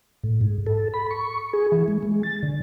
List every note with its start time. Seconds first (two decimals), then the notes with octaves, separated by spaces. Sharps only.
0.24 A2
0.41 G#2
0.67 A4
0.94 B5
1.11 C#6
1.53 G#4
1.72 E3
1.88 G#3
2.03 G#3
2.23 A6
2.43 D3